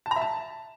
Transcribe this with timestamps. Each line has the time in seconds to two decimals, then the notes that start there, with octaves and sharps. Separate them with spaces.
0.06 A5
0.11 A#5
0.16 E5
0.21 A5